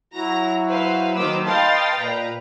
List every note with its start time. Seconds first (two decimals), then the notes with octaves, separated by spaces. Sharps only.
0.14 F#3 E4 F#4 A#5 A#6
0.68 B4 C5 F5
1.15 D#3 F#3 A#3 B4 C5 D6 E6
1.46 B4 D#5 F5 G5 A5 C6 A6
1.96 A#2 B4 A#5